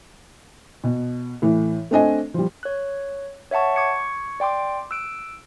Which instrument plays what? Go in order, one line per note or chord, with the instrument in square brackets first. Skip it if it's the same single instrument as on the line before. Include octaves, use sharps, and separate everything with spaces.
[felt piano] B2
A2 E3
A3 C4 D4 D#5 G#5
F3 G3
[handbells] C#5 F#6
C#5 E5 F#5 A5 C#6
C#6 D6 G#6 C#7
D5 G5 C6 D6
E6 F#6 D7